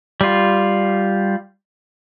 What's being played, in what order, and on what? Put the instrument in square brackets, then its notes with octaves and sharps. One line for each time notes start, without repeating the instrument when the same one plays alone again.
[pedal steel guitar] G3 F4